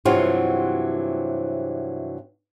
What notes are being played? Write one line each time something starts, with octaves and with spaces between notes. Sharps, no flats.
G2 C3 E3 F#3 F4 F#4